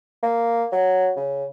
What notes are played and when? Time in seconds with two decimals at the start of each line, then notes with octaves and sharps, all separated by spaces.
0.23 A#3
0.72 F#3
1.16 C#3